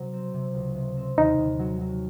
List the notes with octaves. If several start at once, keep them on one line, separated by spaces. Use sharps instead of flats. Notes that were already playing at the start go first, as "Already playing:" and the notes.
Already playing: C3 F#3
C4
C3
C#2
C3
C4
D#2 D#4
D#2
F#3
F#3